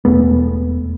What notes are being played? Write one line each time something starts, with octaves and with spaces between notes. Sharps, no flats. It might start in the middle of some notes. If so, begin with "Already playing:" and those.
E1 E2 A3 B3